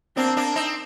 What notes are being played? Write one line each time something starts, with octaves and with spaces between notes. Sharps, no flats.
A#3 C4 D4
A#3 D4
C4 D#4